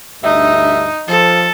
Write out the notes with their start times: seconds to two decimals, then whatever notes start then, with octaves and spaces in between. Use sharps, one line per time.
0.23 D2 G2 D#4 E5
1.08 F3 A4